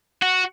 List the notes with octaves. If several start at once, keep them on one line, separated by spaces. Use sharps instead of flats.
F#4